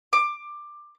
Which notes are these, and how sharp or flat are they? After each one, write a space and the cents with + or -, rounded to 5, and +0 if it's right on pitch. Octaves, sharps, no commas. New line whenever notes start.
D6 +15